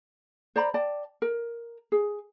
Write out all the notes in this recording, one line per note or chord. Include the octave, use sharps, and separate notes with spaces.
C5 D5 A#5 B5
D5 G5 A5
A#4
G#4